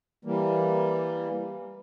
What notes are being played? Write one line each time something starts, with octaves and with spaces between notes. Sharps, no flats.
E3 G3 A#3